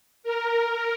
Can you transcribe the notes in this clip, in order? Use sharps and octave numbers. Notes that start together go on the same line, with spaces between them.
A#4